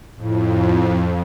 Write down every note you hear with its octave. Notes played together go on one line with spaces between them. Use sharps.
F2 A2